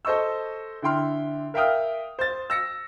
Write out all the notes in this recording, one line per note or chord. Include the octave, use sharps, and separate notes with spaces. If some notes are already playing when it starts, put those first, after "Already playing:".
A4 C5 D#5 C#6 E6
D3 E4 G5 C6 F6
A#4 E5 F5 G5 D#6 F6
C5 A6
E6 A#6 C#7